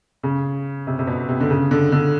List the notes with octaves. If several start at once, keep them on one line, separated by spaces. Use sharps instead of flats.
C#3
C3
C3
B2
C3
D3
C#3
D3
D3